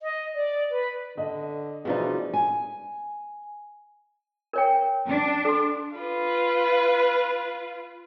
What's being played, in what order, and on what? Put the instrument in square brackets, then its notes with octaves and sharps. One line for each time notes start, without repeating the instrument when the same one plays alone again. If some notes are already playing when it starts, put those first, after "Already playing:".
[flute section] D#5
D5
B4
[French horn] D3 [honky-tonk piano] D#5
[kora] B2 F3 D#4 [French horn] E3 [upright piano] G#3 D4
[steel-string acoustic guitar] G#5
[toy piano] A#4 C#5 G5
[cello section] D4
[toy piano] A4 C6
[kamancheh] F4 B4